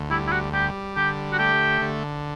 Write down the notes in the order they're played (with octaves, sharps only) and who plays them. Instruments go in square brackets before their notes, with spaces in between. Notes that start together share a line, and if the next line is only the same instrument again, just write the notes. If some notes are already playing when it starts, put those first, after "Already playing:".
Already playing: [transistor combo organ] D2
[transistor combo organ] G3 [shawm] E4
[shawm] E4
F#4
[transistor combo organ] G3 [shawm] G4
[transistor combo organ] D3 [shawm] G4
[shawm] F#4
[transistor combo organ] A3 [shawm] G4
[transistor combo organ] D3